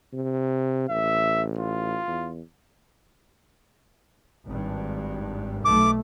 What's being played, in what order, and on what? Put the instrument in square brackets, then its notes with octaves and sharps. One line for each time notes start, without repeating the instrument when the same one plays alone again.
[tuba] C3
[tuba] A1 [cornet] E5
[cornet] F4
[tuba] E2
[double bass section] G#1 G2
[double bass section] B1 A3 [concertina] D6